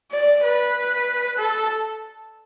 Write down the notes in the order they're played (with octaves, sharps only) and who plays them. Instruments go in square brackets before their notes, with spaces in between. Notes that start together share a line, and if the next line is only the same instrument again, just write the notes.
[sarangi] D5
B4
A4